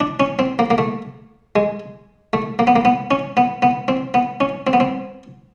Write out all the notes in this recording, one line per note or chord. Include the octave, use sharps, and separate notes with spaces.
D4
C#4
C4
A#3
A#3
A3
G#3
A3
A#3
B3
A#3
B3
C#4
B3
B3
C4
B3
C#4
C4
B3
C4